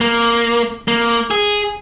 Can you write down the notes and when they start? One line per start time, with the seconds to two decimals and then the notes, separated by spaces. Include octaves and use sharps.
0.01 A#3
0.88 A#3
1.31 G#4